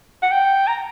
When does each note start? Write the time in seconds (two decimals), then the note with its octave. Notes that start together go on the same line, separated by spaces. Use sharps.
0.23 F#5
0.32 G5
0.68 A#5